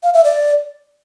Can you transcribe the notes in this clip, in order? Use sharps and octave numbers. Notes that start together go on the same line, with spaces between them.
F5
E5
D5